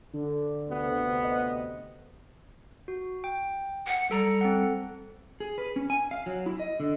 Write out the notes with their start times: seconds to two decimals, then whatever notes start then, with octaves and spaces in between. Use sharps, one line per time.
0.14 D3
0.67 D2 C3 B3
1.24 D#5
2.88 F#4
3.24 G5
3.87 F#5
4.11 G3 A4 A#5 C#7
4.41 C4 A4 F#5
5.40 G#4
5.58 B4
5.76 C#4
5.90 G#5
6.11 F5
6.26 F#3
6.46 E4
6.60 D#5
6.80 D3